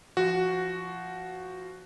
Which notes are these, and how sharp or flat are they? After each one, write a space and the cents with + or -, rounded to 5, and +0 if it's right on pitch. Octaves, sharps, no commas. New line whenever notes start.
F3 -20 F#4 +0